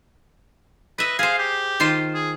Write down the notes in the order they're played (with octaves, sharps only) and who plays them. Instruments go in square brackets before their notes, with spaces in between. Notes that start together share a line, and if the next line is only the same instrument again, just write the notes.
[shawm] B4 [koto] D#5 E5
[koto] G#4 C5 [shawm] F5
[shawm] G4
[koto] D#3 F4 C5
[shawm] G#4